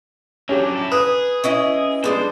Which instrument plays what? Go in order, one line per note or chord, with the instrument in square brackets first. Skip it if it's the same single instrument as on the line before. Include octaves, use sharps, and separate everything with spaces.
[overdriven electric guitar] F#3 D4 [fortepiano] C#4 G4
[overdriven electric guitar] E4 A4
[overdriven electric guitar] G#4 [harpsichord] B4 [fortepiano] D#6
[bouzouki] C#4 E4 D#5
[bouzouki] F3 G3 G#3 [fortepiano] B3 D4 [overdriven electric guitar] C5